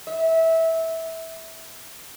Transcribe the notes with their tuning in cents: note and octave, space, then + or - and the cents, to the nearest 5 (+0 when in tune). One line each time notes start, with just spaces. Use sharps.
E5 -20